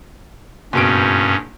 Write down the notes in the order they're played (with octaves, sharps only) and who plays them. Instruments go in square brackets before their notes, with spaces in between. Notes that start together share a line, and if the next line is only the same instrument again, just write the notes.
[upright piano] F#1 B2 D7 [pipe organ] G2 C#4